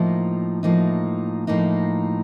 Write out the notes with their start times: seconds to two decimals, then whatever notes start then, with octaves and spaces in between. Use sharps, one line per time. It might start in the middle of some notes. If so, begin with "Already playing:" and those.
Already playing: A2 F3 A#3 D#4
0.63 A2 F3 A#3 D#4
1.47 A2 F3 A#3 D#4